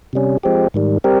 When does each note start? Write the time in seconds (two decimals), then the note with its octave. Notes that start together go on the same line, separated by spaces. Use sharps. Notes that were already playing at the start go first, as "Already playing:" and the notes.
0.13 C3 G3 C#4
0.43 F3 G#3 C4 G4
0.74 G#2 D#3 G3
1.04 G3 C4 G4 A#4